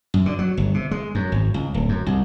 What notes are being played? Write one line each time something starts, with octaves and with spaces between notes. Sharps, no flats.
F#2
D3
F#3
G1
C3
G#3
F#2
G#1
C#2
D1
F#2
C2